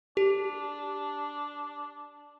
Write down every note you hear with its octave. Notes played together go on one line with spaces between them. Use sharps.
D4 G4